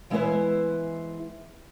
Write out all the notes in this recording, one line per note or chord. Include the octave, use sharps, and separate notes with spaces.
E3 G#3 B3 E4 B4 C5